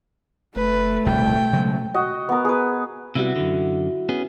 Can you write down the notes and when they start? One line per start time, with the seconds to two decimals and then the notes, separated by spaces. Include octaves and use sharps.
0.56 F#1 A3 B4
1.06 D1 C2 B2 G5
1.53 C#3 F#3 G#3
1.94 F#4 D#5
2.29 B3 A#4
2.45 G#4 B4
3.15 C3 G3 B3 E4 F#4
3.36 F#2 D3
4.09 B3 C#4 G#4